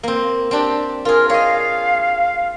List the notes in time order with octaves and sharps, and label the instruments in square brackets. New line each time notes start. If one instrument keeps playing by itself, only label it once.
[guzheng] A#3 C4
C4 D4 G4
[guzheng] F4 G#4 [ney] A#4
[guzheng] C#5 D#5 [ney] F5